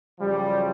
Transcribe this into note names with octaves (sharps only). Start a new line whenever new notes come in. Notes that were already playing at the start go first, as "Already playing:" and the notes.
F#2 C#3 F3 G3